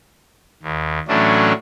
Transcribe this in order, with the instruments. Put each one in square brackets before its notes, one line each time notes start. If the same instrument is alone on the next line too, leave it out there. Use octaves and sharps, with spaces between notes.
[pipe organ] D#2
A2 E3 F#3 A3 C#4 D4